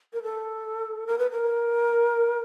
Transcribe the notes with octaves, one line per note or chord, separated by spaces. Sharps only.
A#4
A4
A#4
B4
A#4